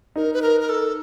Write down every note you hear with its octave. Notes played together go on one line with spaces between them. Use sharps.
D#4 A#4
B4
A#4
A#4
A4